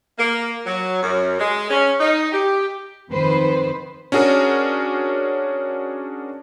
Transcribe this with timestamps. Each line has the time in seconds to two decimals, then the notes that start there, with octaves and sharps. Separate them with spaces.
0.18 A#3
0.66 F#3
1.02 F#2
1.38 G#3
1.70 C#4
1.99 D#4
2.33 G4
3.10 F2 D#3 B4 C5
4.12 C#4 D4 F#4 G#4 A#4